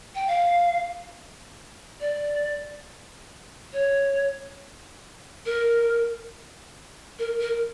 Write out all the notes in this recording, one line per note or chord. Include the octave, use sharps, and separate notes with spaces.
G5
F5
D5
C#5
A#4
A#4
A#4